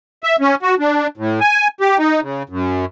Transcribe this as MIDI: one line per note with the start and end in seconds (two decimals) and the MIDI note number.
0.24 0.36 76
0.41 0.55 61
0.63 0.75 66
0.79 1.07 62
1.17 1.40 45
1.41 1.68 80
1.81 1.97 67
1.98 2.20 63
2.22 2.43 49
2.49 2.85 42